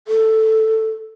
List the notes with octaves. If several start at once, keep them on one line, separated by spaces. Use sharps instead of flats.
A4